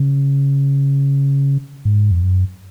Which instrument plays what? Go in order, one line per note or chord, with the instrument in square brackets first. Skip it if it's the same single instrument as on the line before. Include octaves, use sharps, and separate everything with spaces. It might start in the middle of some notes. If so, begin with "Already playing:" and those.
Already playing: [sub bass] C#3
G#2
F2
F#2